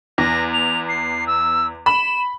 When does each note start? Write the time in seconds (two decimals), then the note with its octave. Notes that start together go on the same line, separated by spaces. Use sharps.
0.18 E2 A#6
0.53 F7
0.89 C7
1.27 E6
1.86 B5 E7